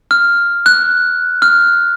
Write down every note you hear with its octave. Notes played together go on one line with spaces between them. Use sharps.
F6
F#6
F6